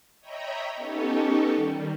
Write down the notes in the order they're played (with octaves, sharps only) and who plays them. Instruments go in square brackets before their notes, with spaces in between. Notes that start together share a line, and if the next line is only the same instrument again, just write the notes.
[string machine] C#5 D#5 E5 G5 A#5 B5
B3 C#4 D#4 G4 A4 C#5
D#3 G3